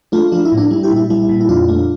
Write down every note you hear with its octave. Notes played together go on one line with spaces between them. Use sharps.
A3 D4 F4
F3 D4 F4
E4
A2
D4
G3 E4
E4 G4
A#2
E4
G3 E4
A#2
E4
F2 D4 F4
A3